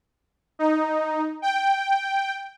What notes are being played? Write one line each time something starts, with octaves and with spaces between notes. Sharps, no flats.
D#4
G5